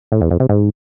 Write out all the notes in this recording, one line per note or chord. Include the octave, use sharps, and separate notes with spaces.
A2
E2
F2
C3
G#2